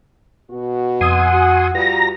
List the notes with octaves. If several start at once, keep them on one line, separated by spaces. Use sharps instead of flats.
B2 F#4
F2 F#5 G#5 C6 D#6 E6
F#4
G3 F4 F#4 B4 A#5 A#6